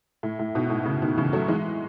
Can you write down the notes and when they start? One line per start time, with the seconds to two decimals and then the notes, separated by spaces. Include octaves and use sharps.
0.23 A2
0.39 A2
0.55 G#2 B2
0.70 A2
0.85 A2 C#3
1.02 B2 D#3
1.17 C#3 E3
1.33 F#3 A3
1.48 E3 G#3